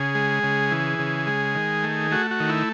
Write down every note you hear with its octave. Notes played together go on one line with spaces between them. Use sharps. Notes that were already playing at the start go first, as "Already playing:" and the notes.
Already playing: C#3 G#4
G#3
C#3
E3
C#3
G#3
D#3
A3
A3 F#4
F#4
D#3
E4